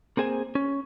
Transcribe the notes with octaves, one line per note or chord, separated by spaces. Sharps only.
A#3 C4 G#4 C5 G#5
C#4